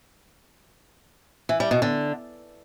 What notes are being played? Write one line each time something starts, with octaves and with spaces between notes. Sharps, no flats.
E3
G3
B2
D3